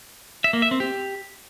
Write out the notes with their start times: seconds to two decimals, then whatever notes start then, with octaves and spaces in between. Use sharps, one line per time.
0.44 E5
0.53 A#3
0.62 E5
0.71 C4
0.80 G4